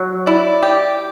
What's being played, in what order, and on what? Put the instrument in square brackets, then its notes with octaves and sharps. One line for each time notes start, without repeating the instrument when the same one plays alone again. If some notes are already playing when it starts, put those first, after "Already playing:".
Already playing: [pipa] F#3
[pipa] E4 [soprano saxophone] D5
[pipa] G4